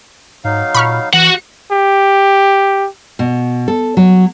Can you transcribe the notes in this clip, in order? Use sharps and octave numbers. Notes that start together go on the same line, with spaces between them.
G#2 F#3 D#4 F5
A#2 B5 C#6 F6
E3 F#4 F#5
G4
B2
A4
F#3